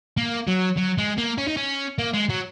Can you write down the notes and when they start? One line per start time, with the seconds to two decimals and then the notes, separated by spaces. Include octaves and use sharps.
0.17 A#3
0.47 F#3
0.77 F#3
0.98 G#3
1.18 A#3
1.38 C#4
1.48 D#4
1.57 C#4
1.98 A#3
2.13 G#3
2.29 F#3